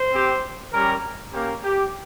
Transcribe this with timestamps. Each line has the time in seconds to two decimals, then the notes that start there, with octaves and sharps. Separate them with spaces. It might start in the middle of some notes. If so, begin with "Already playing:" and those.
Already playing: C5
0.13 C4 G4
0.73 G3 C#4 G4 A#4
1.33 A#3 C#4 G4 A#4
1.64 G4